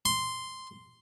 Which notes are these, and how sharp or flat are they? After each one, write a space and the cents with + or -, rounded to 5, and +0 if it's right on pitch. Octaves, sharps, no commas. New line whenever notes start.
C6 -5